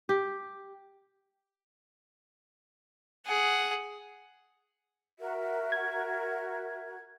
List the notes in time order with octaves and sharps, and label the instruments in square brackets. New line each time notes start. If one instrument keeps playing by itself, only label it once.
[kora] G4
[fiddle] G#4 F#5
[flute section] F#4 A#4 [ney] E5
[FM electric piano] G#6